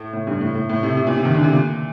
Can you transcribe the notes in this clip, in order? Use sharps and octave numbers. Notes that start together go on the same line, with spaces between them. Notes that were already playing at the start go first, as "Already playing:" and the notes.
Already playing: A2
A2
G2
A2
A2
A2
C3
C3
A#2
C3
D#3
D3
C3
A#2